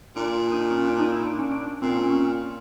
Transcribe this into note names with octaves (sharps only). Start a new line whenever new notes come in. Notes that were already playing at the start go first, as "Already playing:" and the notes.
A#2 D4
D#4
D4
C#4
D4
D#4
E4
D4
C#4
D4
A#2 C4
C#4
C#4